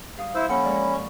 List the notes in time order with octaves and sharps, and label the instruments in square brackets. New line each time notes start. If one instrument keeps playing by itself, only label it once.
[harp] G2 F5 D#6
[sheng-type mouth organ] E4 C5 [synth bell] E6
[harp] F3 A#3 A4 [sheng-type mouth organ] C#4 [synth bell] F#5 C#7 [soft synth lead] B5
[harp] G#3 A#4 [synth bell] D5
[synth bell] C#6